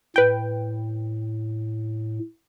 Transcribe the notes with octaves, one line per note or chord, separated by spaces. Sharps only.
A2 B4 G5